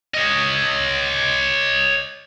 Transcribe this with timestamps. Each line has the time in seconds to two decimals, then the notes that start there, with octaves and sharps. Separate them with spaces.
0.14 C#5 D#5